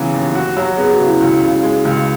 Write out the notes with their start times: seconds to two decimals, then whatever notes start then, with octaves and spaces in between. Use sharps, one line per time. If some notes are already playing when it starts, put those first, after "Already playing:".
Already playing: C#3 E3 F#3 B3
0.13 D#2
0.35 F#4
0.57 F#3
0.78 B3 G#4
0.93 F#4
0.99 C#3
1.07 E4
1.21 C#2 E4
1.42 C#3
1.63 G#3
1.85 C#2